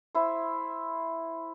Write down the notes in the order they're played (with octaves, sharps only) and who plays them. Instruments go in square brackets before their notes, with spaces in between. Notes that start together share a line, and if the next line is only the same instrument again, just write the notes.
[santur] E4 C5